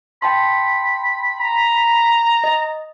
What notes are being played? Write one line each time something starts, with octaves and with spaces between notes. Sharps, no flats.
G5 A5 B5 C6
A#5
D#5